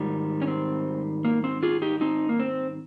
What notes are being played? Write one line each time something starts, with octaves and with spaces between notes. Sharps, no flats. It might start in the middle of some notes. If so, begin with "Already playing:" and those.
Already playing: G#2 D#3 G3
C#4
C4
A#3
C4
F4 G#4
D#4 G4
C4 D#4
A#3
C4